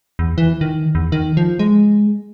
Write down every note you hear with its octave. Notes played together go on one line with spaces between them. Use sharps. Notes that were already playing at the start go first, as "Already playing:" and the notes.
E2
E3
D#3
E2
D#3
F3
G#3